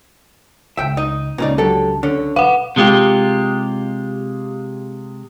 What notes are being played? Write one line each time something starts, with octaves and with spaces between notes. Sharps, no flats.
C#2 C#3 E5 G5
D#4 D#5
C#2 A#2 C#3 A#3 D#4 D5
D3 F#3 G4 A4
D3 C#4
B1 B4 F5 F#5
C3 G#3 F4 G4